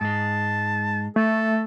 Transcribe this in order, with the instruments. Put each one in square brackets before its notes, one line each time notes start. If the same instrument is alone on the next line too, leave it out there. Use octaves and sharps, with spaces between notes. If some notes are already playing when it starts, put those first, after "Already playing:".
[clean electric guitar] G#2 G#3 [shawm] A5
[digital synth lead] A3 [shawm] A4